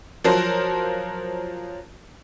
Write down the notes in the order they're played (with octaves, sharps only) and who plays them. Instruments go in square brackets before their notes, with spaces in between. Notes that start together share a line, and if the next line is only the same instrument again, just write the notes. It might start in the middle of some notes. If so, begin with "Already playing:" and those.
[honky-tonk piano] F3 F#3 A#4 C5